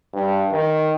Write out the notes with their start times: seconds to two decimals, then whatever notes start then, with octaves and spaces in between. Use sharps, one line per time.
0.13 G2
0.51 D#3